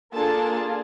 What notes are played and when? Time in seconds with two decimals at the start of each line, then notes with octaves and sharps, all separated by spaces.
0.14 A#3 D4 F4 G#4 A4 A5